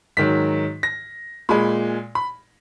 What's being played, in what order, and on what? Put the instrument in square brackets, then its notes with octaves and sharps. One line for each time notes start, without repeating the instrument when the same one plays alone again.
[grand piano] G#2 D#3 F#3 B6
A#6
A#2 G#3 B5
B5